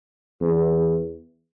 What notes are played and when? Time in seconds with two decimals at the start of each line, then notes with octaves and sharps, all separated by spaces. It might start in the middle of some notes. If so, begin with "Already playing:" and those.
0.41 E2